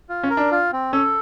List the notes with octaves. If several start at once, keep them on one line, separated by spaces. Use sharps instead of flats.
F4
C#4
A#4
D4
F4
C4
C#4 A4